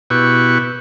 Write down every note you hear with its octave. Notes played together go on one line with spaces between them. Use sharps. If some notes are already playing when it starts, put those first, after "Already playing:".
B2 E4 G4 B4 C#6